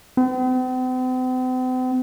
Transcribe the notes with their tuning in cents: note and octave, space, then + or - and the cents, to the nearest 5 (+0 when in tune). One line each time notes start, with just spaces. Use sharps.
C4 -45